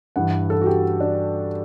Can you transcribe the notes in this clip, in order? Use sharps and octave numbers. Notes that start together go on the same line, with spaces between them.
G2 E3 F#5
A4
F#4
G4
D4